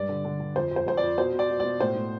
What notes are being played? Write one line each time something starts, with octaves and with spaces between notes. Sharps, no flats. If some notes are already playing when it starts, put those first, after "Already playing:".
Already playing: G2 D5
D3
D3
D3
F2 C5
F2
C5
F2 C5
D5
F2
B2 C5
B2
D5
B2
B2 D5
A2 C5
A2